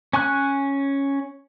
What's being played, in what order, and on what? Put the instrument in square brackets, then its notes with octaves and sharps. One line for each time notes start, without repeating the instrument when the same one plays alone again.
[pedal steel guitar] C#4 G#5 C#6 F#6